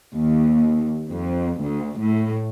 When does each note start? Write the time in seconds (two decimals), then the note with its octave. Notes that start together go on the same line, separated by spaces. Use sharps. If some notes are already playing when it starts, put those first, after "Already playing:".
0.14 D#2
1.10 F2
1.62 D2
1.99 A2